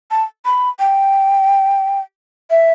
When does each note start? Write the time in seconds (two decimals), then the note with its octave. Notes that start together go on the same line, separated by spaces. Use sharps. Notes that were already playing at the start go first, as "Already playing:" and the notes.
0.11 A5
0.45 B5
0.79 G5
2.50 E5